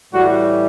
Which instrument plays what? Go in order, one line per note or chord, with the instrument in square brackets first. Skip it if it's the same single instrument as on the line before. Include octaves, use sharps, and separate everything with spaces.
[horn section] A2 E3 G3 F#4